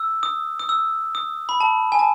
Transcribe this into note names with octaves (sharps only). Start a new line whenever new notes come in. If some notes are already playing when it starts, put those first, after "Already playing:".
Already playing: E6
D#6
D#6
E6
D#6
B5
A5
G#5
A5